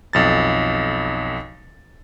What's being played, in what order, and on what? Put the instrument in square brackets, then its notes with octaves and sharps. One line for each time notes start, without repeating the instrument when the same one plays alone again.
[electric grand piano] B1 F2 A6